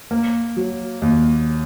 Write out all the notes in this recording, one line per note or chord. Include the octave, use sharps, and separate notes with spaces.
A#3
F#3
D#2